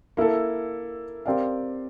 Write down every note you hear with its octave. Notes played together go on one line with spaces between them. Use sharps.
A#3 E4 A4
C4 G4 A#4 D5 F5